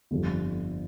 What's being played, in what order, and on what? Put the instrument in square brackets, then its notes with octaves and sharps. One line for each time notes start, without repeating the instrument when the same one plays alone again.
[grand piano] G1 F2 D3 G3